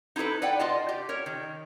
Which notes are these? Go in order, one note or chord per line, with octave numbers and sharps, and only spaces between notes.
D#4 E4 G#4 A4 B4
B4 D5 F#5 G5
F4 D5 D#5 A5
G4
A#4 C#5
D#3